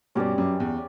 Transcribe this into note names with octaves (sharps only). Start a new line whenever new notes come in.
G2 B2 C#4 G4 B4 D5
F#2
E2